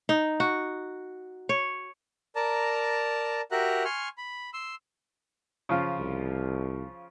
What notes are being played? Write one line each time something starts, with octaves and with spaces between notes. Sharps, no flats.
D#4
F#4
C#5
A#4 D5 A5 A#5
F#4 G4 A#4 E5 A#5 F#6
G#5 C6 C#6 F6
B5
C6 E6
C#3 F3 F4
C2